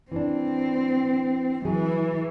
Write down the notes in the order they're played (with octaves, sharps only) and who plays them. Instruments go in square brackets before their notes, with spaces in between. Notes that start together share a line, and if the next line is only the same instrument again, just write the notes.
[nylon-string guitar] E3 D4 [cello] C4
[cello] E3 [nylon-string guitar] F#3 G#4